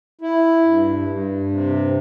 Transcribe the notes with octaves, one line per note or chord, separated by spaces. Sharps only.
E4
G2
G2
C3